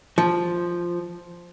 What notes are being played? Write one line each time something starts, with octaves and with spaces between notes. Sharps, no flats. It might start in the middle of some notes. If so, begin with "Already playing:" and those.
F3